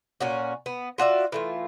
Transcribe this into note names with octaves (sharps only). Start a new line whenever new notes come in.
A#2 C#4 F#4
B3
F4 F#4 D5 E5
E3 A3 F4